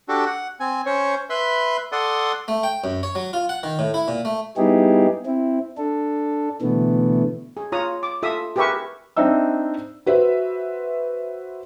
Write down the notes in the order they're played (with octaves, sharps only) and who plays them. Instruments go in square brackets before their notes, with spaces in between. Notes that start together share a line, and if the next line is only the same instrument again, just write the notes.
[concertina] D4 F#4 G4 A4
F#5
C4 G#5
C#4 C5 C#5
B4 E5 B5 C6
A4 D5 F#5 C6 D#6
[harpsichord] A3
G5
F#2
C#5
F#3
F4
F#5
D#3
A2
E4
A#2
A3
[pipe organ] G3 B3 D#4 E4 G4 G#4
C4 E4
D4 A4
B2 D3 E3 A3 B3
[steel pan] G#4
F4 C#5 A#5 D#6
D6
F4 A4 E5 D#6
G4 G#4 A#4 B4 E5 C#6
[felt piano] C4 D4 D#4 E5 E6
F#4 B4 C5 E5